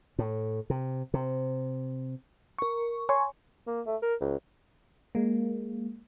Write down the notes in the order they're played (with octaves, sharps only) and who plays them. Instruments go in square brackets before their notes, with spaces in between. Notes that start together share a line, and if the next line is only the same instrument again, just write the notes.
[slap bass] A2
C3
C3
[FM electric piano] A#4 C#6
C#5 G#5 C6 C#6
[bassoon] A#3
A3
A#4
C#2
[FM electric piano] G#3 A#3